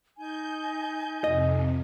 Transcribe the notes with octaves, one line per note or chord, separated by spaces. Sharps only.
D#4 G#5 G6
F2 C3 D#5